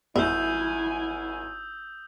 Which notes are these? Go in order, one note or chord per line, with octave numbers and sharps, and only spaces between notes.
G#1 E4 E5 G#5 D#6 E6 G6